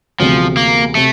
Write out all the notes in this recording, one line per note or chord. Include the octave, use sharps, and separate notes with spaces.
E1 D2 C3 F3
A#3
C3 A3